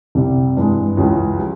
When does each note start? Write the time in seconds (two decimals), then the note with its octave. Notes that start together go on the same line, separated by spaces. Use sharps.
0.15 C2 C3 G3 C4
0.57 G2 E3 G#3
0.97 C#2 C#3 E3 G#3 C#4
1.39 F3